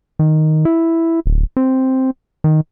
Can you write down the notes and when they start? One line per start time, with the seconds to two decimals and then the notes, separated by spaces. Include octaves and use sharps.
0.19 D#3
0.65 E4
1.26 D1
1.57 C4
2.44 D#3